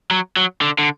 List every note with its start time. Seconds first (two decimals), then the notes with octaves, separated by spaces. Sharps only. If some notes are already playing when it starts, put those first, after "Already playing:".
0.11 F#3
0.37 F#3
0.62 D3
0.79 D3